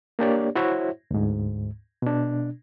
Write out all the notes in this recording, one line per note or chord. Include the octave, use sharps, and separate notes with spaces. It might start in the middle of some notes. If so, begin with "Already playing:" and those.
A#3 D4 G4 C#5 D5
E4 F#4 C5 C#5 E5
D2 G#2
B2 D4